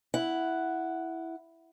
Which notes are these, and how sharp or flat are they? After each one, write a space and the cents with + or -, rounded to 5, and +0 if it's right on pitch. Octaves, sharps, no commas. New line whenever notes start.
E4 +0 F#5 +0